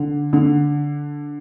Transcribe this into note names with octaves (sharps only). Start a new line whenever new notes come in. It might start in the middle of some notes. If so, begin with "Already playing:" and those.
Already playing: D3
D3